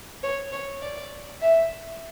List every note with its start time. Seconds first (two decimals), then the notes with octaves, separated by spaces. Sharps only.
0.23 C#5
0.52 C#5
0.82 D5
1.41 E5